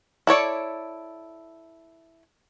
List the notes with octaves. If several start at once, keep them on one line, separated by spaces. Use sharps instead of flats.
E4 A4 C#5 D5